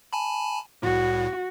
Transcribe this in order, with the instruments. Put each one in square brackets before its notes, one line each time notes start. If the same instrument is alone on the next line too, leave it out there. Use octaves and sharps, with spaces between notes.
[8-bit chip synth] G#5 A5 B5
[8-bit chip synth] C2 A2 [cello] F#4